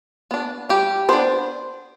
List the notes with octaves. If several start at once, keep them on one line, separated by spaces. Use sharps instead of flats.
B3 D4
G3 G4
B3 D4 C5